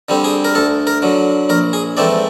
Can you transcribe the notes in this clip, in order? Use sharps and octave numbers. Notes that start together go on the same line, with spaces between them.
D3 G3 C4
G#4
A#4
D2 A4
A#4
D3 F#3
A#1 A#4
G#4
G#2 E3 A3 C4 D5